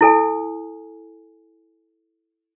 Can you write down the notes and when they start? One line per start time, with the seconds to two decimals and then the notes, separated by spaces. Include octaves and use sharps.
0.01 E4 A4 G#5